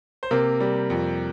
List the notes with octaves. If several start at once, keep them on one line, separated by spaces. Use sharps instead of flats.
C5
C3 A#3 A#4
G3
F2